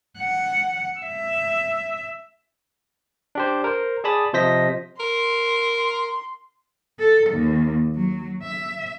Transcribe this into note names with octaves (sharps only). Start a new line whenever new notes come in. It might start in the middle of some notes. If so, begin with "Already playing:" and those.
F#5
E5
D4 G4 C5
A#4 C5
G#4 D5 A5 B5 D#6
C3 F3 C5 D#5 A#6 B6
A#4 C6
A4
D#2
F#3
E5